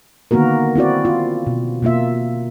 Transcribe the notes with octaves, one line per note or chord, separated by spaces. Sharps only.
D3 D#3 A#3 B3 F#4 A#4
C4 E4 F#4 D5
F4
B2
B2 A#3 F4 E5